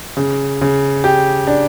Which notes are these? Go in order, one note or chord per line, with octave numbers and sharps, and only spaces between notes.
C#3
C#3
G4
D4